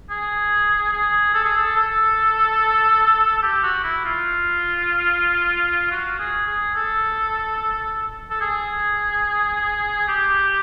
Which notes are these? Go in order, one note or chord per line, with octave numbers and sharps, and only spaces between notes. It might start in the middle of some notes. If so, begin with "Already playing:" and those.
G#4
G#4
A4
G#4
A4
A4
G4
F#4
E4
F4
F#4
G#4
G#4
A4
A4
G#4
G4